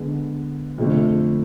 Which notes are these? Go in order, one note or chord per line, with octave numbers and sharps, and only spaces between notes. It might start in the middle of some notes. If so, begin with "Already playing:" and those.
Already playing: D3 G#3 B3
F2 D3 A3